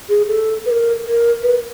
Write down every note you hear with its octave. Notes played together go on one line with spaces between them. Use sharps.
G#4
A4
B4
A#4
A#4
B4